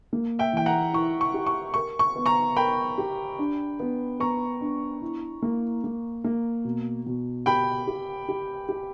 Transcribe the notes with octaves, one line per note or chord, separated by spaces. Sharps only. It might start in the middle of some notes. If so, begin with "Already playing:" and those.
A#3
E5 G5
E3 G5
F#5 A#5
E4 C#6
C#6
G4
C#6
A#4 C#6
C#6
B3
A#5 C#6
A#4 G5 B5
G4
D4
B3
B3 A#5 C#6
D4
E4
A#3
A#3
A#3
B2
B2
G4 G5 B5
G4
G4
G4